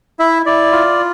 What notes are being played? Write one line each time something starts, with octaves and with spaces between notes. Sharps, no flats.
E4 E5
E4 D5
F4